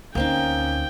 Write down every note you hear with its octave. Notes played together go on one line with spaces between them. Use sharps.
D2 A#3 C4 C#4 D#4 G5